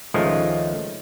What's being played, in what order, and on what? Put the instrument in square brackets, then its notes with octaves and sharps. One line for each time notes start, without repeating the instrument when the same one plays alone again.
[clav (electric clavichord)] C#2 D#3 F3 G#3 A3